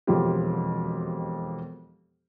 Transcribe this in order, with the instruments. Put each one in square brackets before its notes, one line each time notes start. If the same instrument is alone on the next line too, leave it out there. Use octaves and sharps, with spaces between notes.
[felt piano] E1 F2 B2 F4 G4